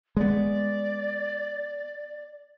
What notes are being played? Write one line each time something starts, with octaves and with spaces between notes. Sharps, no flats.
G#3 B3 D5